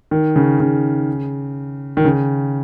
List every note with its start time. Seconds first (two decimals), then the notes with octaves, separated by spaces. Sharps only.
0.11 D#3
0.36 C#3
0.60 C#3
1.97 D#3
2.05 C#3